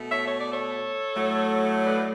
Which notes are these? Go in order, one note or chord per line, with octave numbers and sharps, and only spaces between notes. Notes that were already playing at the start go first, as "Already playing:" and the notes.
Already playing: B2 A3
C#5 E5
C#5
D5
A4 C#5
A2 F#3 A3
B4 D5